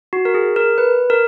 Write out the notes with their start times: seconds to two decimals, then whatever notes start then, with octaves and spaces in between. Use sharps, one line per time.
0.13 F#4
0.25 A#4
0.34 G#4
0.56 A#4
0.78 B4
1.10 A#4